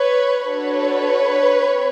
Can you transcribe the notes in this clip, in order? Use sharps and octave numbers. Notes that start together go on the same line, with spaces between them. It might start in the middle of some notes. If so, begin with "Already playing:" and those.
Already playing: B4 C#5
D4 F#4 A4 B4 C#5
C4